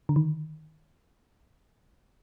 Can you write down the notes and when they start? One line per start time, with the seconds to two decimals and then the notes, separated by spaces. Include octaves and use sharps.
0.09 D3
0.16 D#3